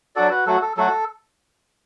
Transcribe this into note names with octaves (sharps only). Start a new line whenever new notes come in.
F#3 D4 F#4 A4 D5
F#4 B4
F#3 A3 F#4 A4
A4
F#3 A3 F#4 A4